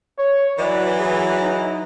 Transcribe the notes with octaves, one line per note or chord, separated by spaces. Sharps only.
C#5
E3 F#3 D5
G#4
D#4